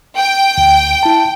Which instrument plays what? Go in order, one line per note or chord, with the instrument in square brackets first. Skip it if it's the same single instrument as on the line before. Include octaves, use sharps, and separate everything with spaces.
[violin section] G5
[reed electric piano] D2
E4 A5